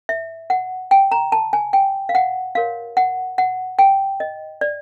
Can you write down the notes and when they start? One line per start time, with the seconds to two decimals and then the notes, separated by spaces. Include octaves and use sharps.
0.09 E5
0.50 F#5
0.91 G5
1.12 A#5
1.32 A5
1.53 G#5
1.73 G5
2.09 F5
2.15 F#5
2.55 F#4 A#4 C#5 F5
2.97 F#5
3.38 F#5
3.79 G5
4.20 D#5
4.61 D5